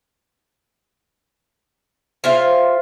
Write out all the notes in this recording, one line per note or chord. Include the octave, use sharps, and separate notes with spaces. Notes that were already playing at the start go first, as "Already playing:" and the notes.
F4 G#4 C5 E5 F5